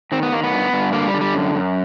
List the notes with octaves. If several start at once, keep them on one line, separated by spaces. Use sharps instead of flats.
D#3 C4
B3
D#3 A#3
B3
G2
G2
D3 A#3
G3
D3
G3
F#2
F#2